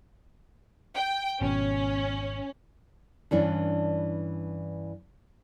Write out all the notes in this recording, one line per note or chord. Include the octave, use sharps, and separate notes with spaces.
G5
G#1 B2 C#4
G2 E3 C#4 D4